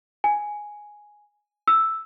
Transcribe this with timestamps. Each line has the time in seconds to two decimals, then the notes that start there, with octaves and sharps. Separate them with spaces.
0.24 G#5
1.68 E6